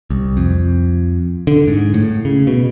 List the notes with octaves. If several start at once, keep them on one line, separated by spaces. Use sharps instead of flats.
C2
F2
D3
G#2
A2
C#3
B2